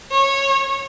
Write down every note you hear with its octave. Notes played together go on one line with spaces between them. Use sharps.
C#5